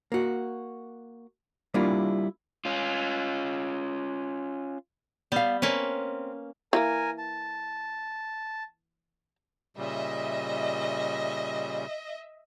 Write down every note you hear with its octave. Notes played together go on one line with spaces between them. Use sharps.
A#3 F#4
G3 A#3 D4 E4 F4
C#4 F4
G3 B3 F5
A#3 C4 C#4 B4
E3 G#3 A#3 A#4 G#5
A5
A#2 C#3 G3 D#5 E5